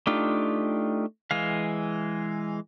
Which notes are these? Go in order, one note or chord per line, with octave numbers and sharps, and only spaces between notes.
A3 D4 D#4 F4 G4
E3 G#3 F5